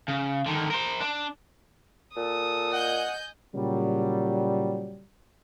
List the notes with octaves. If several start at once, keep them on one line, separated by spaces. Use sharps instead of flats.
C#3
D3 D#3
A#4 C5
D4
A#2 A4 D#6
D#5 F#5 G#5 G6
A#2 C#3 F#3 G3